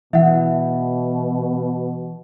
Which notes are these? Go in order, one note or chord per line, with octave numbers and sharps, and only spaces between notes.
B2 E3 E5 F#5